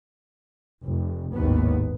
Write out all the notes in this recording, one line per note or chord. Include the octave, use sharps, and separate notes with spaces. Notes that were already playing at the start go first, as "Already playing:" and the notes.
F1
G#1 D#2 A2 B3